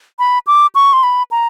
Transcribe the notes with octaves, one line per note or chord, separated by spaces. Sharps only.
B5
D6
C#6
C6
B5
A#5